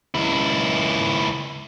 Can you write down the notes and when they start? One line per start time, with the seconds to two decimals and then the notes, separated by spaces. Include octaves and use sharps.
0.15 C#2 E4